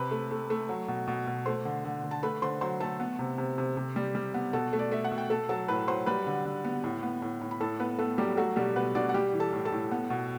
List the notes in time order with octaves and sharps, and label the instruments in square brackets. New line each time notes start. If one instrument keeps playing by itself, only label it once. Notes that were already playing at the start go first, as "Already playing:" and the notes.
Already playing: [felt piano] C3 B4 B5
A3
A3
A3
F#3
B2
B2
B2
A3 C5 C6
D3
D3
D3
A5
A3 B4 B5
D3 C5 C6
F#3 C5 C6
A3 A4 A5
B3
C3
C3
C3
C3
G3
G3
B3
B2 A4 A5
A3
D5
A3 E5
F#5
B2
G5
A3 A4 A5
F#3 A4 A5
A2 B4 B5
F#3 C5 C6
G3 B4 B5
D3
D3
B3
A2
B3
A2
A2
B5
A2 A4 A5
B3 B4
A3 B3 A4
F#3 G3 G4
F#3 A3 F#4
B2 G3 G4
B2 B3 B4
B2 D4 D5
F#5
G3 G4 G5
E3
A4 A5
A2
A4 A5
A2
B3
B2